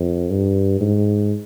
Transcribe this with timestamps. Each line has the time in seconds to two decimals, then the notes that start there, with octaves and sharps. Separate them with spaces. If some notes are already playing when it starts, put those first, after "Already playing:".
Already playing: F2
0.30 G2
0.81 G#2